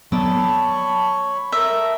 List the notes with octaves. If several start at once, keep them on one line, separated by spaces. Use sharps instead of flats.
F#3 B3 A4 C#5 D5 B5 C#6 D#6
A3 A#4 D#5 E5